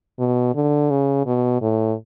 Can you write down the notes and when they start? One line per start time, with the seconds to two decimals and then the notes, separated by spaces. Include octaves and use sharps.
0.19 B2
0.55 D3
0.90 C#3
1.26 B2
1.62 A2